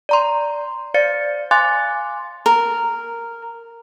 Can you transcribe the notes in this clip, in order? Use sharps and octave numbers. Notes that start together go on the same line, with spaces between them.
D5 A#5 C6
C5 D5 F5 A6 C#7
F5 G#5 C6 D6 F#6 A6
A#4